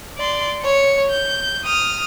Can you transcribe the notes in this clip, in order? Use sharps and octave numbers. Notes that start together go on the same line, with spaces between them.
D5 C6
C#5 C#7
G6
D#6 F6